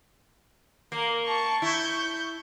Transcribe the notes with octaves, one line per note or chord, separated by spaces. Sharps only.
A#3 A#4
A5 C#6
E4 C#6 G6